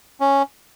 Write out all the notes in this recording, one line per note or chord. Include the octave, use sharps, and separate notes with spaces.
C#4